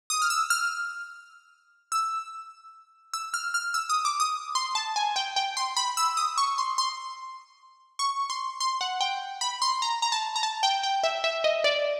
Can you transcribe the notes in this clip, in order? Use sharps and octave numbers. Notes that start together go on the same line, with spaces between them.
D#6
F6
E6
F6
E6
E6
F6
F6
E6
D#6
D6
D#6
C6
A5
G#5
G5
G5
C6
B5
E6
D#6
C#6
C6
C6
C#6
C6
C6
F#5
G5
B5
C6
A#5
A#5
A5
A#5
A5
G5
G5
E5
E5
D#5
D5